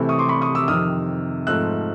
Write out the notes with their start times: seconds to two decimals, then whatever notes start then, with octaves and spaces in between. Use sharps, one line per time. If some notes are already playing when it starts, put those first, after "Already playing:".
Already playing: C3 E3 A3 C4 E4
0.09 C#6 D#6
0.19 C6 D6
0.29 B5 C#6
0.41 C#6 D#6
0.55 D6 E6
0.68 F2 C3 D#3 D#6 F6
1.47 G#2 F3 A3 C4 E6 F#6